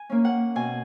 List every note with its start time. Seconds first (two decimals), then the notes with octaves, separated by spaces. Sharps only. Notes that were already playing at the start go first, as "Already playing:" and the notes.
Already playing: G#5
0.10 A#3 C#4
0.25 F#5
0.56 B2 G#5